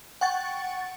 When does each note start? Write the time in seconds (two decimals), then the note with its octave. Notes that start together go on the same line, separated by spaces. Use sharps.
0.21 F#5 G5 C#6 A6